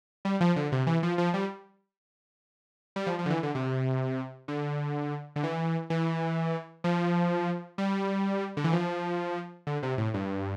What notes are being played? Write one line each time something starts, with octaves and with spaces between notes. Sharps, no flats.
G3
F3
D3
C3
E3
F3
F3
G3
G3
F3
F3
D3
E3
D3
C3
D3
D3
E3
E3
F3
G3
D3
E3
F3
D3
C3
A2
G2